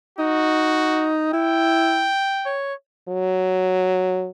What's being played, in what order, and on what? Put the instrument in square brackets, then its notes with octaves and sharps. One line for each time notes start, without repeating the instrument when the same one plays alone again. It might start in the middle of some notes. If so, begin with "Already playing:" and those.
[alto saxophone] D#4 [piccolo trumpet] F#4
[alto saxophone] E4 [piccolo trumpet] G5
[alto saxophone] C#5
[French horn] F#3